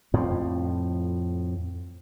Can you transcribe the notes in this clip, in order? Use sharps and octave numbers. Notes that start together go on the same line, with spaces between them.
F2 A2 F3